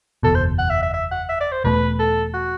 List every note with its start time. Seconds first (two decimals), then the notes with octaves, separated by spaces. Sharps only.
0.23 F#1 E2 B2 A4
0.35 C5
0.59 F#5
0.70 E5
0.82 E5
0.93 E5
1.11 F#5
1.29 E5
1.40 D5
1.52 C5
1.64 E1 E2 B2 A3 B4
1.99 A4
2.34 F#4